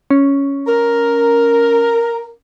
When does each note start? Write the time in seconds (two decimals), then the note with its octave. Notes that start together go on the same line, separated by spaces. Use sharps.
0.11 C#4
0.67 A#4